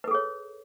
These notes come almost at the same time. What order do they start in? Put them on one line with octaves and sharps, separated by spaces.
B4 A4 G#4 C#5